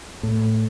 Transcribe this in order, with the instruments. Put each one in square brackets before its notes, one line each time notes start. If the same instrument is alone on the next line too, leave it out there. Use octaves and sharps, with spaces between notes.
[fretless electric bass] A2